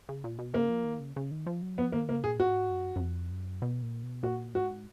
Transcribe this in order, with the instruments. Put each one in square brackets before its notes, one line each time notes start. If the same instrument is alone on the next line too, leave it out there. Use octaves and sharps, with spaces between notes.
[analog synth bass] C#3
A#2
B2
[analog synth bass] C#3 [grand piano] A#3
[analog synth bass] F3
D#3
C#3
C#3
D#3
F3
F#3
[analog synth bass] F3 [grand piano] B3
[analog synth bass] D#3 [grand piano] A#3
[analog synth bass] C#3 [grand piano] A#3
[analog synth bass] A#2 [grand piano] G#4
[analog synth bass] G#2 [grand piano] F#4
[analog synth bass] F#2
F#2
F2
F#2
B2
A#2
B2
[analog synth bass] A#2 [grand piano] F#4
[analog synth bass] G#2 [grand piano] F#4